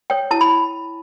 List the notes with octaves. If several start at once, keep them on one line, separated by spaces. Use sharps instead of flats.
C#5 G5
E4 A5
B5